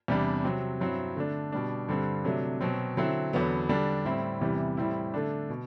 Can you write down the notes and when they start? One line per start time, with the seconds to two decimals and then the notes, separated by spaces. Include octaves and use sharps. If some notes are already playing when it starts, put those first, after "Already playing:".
0.08 E2 C3 G3 D4
0.44 C3 F#3 C4
0.80 G2 F#3 C4 E4
1.16 D3 A3 D4
1.52 B2 G3 D4
1.88 G2 D3 G3 C4
2.24 C3 F#3 A3 D4
2.61 B2 F#3 C4
2.97 D3 F#3 C4 E4
3.33 E2 D3 F#3 B3
3.69 D3 G3 D4
4.05 A2 G3 C4 E4
4.41 E2 C3 E3 G3
4.77 A2 G3 C4 E4
5.14 D3 A3 D4
5.49 B2